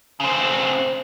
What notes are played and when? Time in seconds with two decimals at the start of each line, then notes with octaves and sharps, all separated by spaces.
0.20 C#3 C4